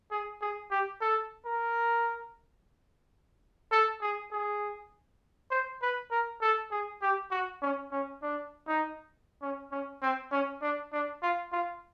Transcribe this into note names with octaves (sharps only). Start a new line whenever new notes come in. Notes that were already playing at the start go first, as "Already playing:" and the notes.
G#4
G#4
G4
A4
A#4
A4
G#4
G#4
C5
B4
A#4
A4
G#4
G4
F#4
C#4
C#4
D4
D#4
C#4
C#4
C4
C#4
D4
D4
F4
F4